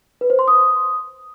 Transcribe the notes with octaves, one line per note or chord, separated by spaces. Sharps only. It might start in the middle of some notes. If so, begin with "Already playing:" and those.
B4
C5
C6
D#6